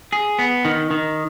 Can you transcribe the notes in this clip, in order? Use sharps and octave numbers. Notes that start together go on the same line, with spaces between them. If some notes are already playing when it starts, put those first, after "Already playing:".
G#4
B3
D#3
D#3